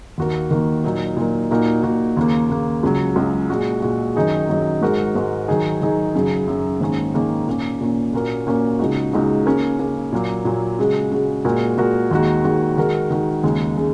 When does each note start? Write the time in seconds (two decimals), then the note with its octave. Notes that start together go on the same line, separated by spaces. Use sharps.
0.18 D#2 D#3 A#3 F#4 A#4
0.51 D#2 D#3 A#3 F#4 A#4
0.84 A#2 F#3 D#4 A#4
1.17 A#2 F#3 D#4 A#4
1.51 A#2 A#3 D#4 F#4 A#4
1.83 A#2 A#3 D#4 F#4 A#4
2.17 D#2 C#3 A#3
2.50 D#2 C#3 A#3
2.83 C#2 C#3 F#3
3.16 C#2 C#3 F#3
3.50 A#2 G#3 F#4
3.82 A#2 G#3 F#4
4.16 F#2 D#3 F#3 D#4 G#4
4.48 F#2 D#3 F#3 D#4 G#4
4.81 G#2 G#3 F#4 A#4
5.15 G#2 G#3 F#4 A#4
5.48 D#3 F#3 D#4 G#4
5.82 D#3 F#3 D#4 G#4
6.15 F#2 C#3 F#3
6.47 F#2 C#3 F#3
6.80 G#2 D#3 A#3 C#4 G#4
7.14 G#2 D#3 A#3 C#4 G#4
7.47 A#2 A#3 C#4
7.81 A#2 A#3 C#4
8.13 A#2 A#3 C#4 F#4 A#4
8.47 A#2 A#3 C#4 F#4 A#4
8.79 C#2 C#3 G#3 D#4 F#4
9.13 C#2 C#3 G#3 D#4 F#4
9.46 C#3 A#3 C#4 A#4
9.79 C#3 A#3 C#4 A#4
10.13 A#2 F#3 A#3
10.45 A#2 F#3 A#3
10.79 C#3 G#3 F#4
11.12 C#3 G#3 F#4
11.45 A#2 G#3 F#4 A#4
11.78 A#2 G#3 F#4 A#4
12.11 D#2 D#3 G#3 F#4
12.44 D#2 D#3 G#3 F#4
12.77 D#3 G#3 F#4 A#4
13.10 D#3 G#3 F#4 A#4
13.44 D#2 C#3 G#3
13.77 C#3 G#3